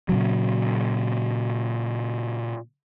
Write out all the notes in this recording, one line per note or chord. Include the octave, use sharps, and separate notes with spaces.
A#2 C#3 F#3